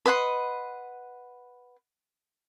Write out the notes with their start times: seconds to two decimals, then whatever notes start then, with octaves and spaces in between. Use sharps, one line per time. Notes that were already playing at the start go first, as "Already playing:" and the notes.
0.06 B4 D#5 F#5 C6